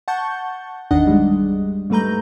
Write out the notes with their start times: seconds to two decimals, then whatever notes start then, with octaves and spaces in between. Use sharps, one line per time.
0.08 F#5 A5 C#6 G6
0.91 G#1 E2 D#3 D4 D#5 F#5
1.07 G3 G#3
1.90 G#2 G3 A3 B4 A#5 G6